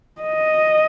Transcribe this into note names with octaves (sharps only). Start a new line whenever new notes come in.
D#5